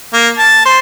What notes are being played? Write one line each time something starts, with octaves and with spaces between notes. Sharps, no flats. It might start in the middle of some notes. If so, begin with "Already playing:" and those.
A#3
A5
C5